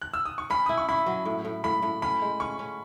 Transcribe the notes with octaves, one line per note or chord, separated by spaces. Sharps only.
F#6
E6
D#6
C#6
C#4 B5
E4 D#6
C#6
E4 B5
F#3
A2
A2
A2 B5
A2
C#4 B5
G#3
C#4 C#6
C#4